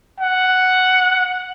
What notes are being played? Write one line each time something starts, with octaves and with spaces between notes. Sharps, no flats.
F#5